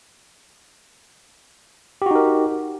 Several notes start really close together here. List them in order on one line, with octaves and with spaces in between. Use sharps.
G4 F#4 D#4 A#4